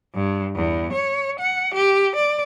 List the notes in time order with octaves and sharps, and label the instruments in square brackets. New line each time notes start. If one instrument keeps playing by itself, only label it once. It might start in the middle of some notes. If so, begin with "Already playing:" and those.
[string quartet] G2
E2
C#5
F#5
G4
D5